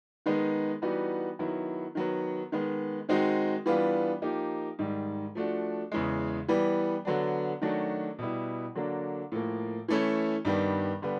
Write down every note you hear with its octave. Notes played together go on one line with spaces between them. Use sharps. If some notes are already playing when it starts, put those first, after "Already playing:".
D#3 G#3 B3 D#4
E3 G3 B3 D#4 F#4
D#3 F#3 B3 E4
D#3 F#3 B3
D#3 G#3 B3
D#3 G#3 C4 D#4 F#4
E3 G3 B3 D4 F4
F3 A#3 D#4 G4
G#2 D#3 G3
F3 A3 D4 F#4
E2 C#3 E3 G#3
E3 G3 B3
D3 F#3 B3 D4
D#3 F#3 A3 D4 F#4
B2 G3 B3 E4
D3 F#3 A#3 D4
A2 F3 A#3
E3 A3 C#4 E4
G2 D#3 G3 B3
D3 G3 B3